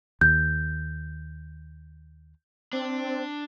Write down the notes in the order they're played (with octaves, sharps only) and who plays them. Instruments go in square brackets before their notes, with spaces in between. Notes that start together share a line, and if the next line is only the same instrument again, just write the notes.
[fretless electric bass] D#2 [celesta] G6
[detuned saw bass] C4 [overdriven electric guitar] D4